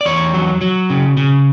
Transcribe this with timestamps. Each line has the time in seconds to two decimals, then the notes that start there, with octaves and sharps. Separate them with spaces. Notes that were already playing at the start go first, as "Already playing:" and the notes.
0.01 D5
0.05 E2 C#5
0.34 F#3
0.61 F#3
0.90 C#3
1.17 C#3